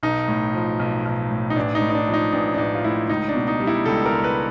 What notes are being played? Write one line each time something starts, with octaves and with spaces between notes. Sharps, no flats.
B1 D#4
A2
F3
B1
B1
A2
D#4
A1 D4
D#4
A2
D#4
D4
F3
D#4
A1 D4
D4
A1 D#4
F4
A2 E4
C#2 D#4
D4
B2
D#4
G3
E4
C#2 A4
A#4
C#2
B4